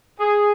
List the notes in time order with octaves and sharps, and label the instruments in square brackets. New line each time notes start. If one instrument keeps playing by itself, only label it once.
[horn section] G#4